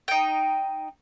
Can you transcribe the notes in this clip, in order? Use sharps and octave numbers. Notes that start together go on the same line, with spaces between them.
D#4 G5